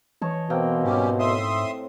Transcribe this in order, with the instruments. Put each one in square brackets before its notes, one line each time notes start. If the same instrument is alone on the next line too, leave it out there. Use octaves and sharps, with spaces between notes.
[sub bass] E3 [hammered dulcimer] C#5 D#5 A5
[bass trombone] B2 [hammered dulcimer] A#3 C4 G5
[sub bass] G#2 [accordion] G3 C#4 G4
[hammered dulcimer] A2 [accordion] E5 C6 D#6